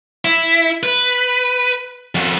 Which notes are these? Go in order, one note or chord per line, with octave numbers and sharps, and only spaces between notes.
E4
B4
F2 F#4